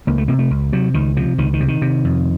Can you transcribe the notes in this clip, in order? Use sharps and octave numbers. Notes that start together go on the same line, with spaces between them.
C#2 A#3
A3
C3 A#3
A3
C#2
C3 F#3
C#2 D#3
C3 F3
C#2 D#3
D#3
C3
D#3
C3
F2